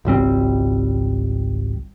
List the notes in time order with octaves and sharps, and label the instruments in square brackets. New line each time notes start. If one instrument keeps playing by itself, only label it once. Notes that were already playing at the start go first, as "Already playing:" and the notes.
[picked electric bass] G#1 C#2 G3 C4